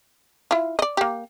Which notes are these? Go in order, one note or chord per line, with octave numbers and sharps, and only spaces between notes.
E4 F4
D5 D#5
A#3 G4